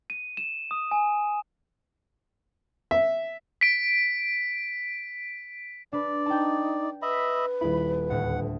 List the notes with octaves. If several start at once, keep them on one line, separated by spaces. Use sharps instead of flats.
D#7
E7
D#6
G#5
E5
B6 D7
D4 B4 D5
D#4 G5 A5
B4 D#5 E5 B5
D#1 E4 B5
D2 A2 F#5